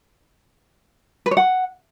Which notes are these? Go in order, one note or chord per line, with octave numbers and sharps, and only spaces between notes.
B4
C#5
F#5